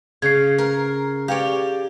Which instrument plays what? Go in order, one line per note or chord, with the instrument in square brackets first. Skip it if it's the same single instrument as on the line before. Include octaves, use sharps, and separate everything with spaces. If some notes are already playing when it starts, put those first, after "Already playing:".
[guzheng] C#3 [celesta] G#6 C7
[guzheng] A#4
[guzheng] G4 C#5 D5 [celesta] F5